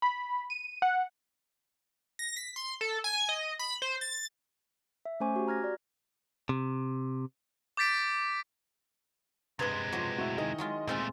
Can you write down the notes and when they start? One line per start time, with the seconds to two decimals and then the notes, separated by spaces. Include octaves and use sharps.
0.02 B5
0.50 D#7
0.82 F#5
2.19 A#6
2.37 B6
2.56 C6
2.81 A4
3.04 G#5
3.29 D#5
3.59 B5
3.82 C5
4.01 A6
5.05 E5
5.20 A3 C#4 C5 G#5 C#6 D6
5.36 F#4 G4
5.47 A#5 F6 G#6 A#6
5.63 F#4 D5
6.49 C3
7.77 D6 G6 A6 B6 D7
9.59 G2 C3 G#3 B4 C5 G#6 A6
9.92 F3 F#3 G4 C5
10.18 A2 F#4 E5
10.38 D#3 E4 G#4 D#5
10.58 F#3 G#3 F4
10.87 A#2 G#3 A3 C4 F4